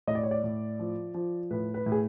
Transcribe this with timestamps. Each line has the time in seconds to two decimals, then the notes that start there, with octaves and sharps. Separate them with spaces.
0.07 A2 D#5
0.15 D5
0.23 C#5
0.31 D5
0.44 A2
0.79 F3
1.14 F3
1.51 A2 B4
1.74 B4
1.86 A2
1.92 G#4